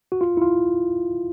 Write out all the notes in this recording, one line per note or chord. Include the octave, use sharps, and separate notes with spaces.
F#4
F4
E4
F4